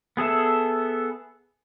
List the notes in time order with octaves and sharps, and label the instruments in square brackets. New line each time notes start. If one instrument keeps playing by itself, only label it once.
[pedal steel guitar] B3 G#4 A4 E5